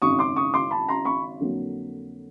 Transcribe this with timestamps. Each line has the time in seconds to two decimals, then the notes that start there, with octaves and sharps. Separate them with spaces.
0.02 G#1 F#2 C#3 C#6 D#6
0.19 C6 D6
0.36 C#6 D#6
0.54 C6 D6
0.71 A5 B5
0.89 A#5 C6
1.05 B5 C#6
1.40 F2 D3 F#3 A#3